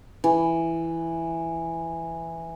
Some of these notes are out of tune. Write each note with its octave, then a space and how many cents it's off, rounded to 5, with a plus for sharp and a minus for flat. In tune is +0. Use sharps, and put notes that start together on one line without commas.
E3 +5